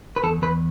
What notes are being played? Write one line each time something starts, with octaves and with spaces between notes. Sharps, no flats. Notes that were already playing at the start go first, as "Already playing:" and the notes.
B4
E2 A4
E2 B4